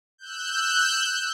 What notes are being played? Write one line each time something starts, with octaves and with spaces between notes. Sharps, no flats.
E6 F#6 G6